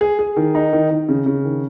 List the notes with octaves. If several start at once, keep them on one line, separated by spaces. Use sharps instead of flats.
G#4
G#4
D#3
D#4
D#3
D#3
C#3
C#3
D#3